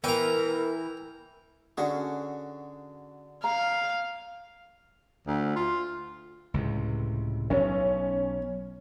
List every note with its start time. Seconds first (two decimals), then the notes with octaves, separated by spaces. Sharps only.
0.04 E3 A#4 G5 A#5
1.77 D3 C#4 F#4 G#4 A4 F#5
3.44 F5 A#5
5.27 D2
5.56 F4
6.54 C#2 A2 C3
7.50 B1 C#4